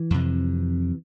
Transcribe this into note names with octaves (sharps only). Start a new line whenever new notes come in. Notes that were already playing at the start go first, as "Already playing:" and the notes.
Already playing: E3
F2 C3